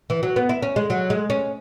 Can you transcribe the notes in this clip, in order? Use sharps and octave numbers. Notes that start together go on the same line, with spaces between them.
E3
F#3
B3
E4
C#4
G#3
F#3
G#3
C#4